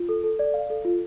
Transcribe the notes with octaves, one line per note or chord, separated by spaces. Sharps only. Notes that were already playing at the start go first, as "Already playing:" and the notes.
Already playing: F4
A4
A4
D5
F5
A4
F4